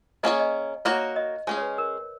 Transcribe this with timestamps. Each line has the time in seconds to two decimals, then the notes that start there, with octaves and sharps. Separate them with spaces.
0.23 A#3 C#4 G#4 C#5 D#5
0.40 D#5
0.85 A#3 D#4 F#4 A#4 C#5
1.16 D#5
1.47 G#3 C#4 G#4 C#5
1.57 C#5
1.62 B4
1.78 A#4